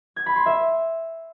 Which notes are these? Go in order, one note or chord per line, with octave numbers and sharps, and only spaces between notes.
G#6
B5
C6
E5